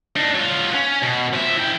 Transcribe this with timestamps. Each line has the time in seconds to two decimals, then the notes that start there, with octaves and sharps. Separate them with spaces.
0.17 D4 D#4
0.35 F#3 F4
0.74 C#4
1.03 B2
1.33 F3 E5
1.57 E3 G5